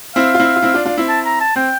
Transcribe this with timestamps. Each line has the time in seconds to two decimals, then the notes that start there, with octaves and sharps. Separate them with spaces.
0.15 C4 E4 F5
0.34 F4
0.40 C4 E4
0.56 F4
0.62 C4 E4
0.74 D4 F4
0.86 D4 F4
0.98 C4 E4
1.09 A5
1.25 A#5
1.41 A5
1.56 C4 G5